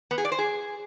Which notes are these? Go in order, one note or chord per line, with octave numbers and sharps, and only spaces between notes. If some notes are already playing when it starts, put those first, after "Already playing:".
B3
G#4
D5
C5
G#4